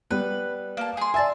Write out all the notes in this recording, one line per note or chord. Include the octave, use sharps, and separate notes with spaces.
G3 B3 B4
A#3 A5
G#4 C6
D5 E5 G#5 A5